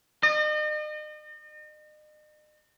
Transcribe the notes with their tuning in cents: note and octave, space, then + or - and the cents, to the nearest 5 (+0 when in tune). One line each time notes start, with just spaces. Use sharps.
D#5 -40